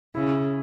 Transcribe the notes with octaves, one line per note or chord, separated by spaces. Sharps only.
C#3 E4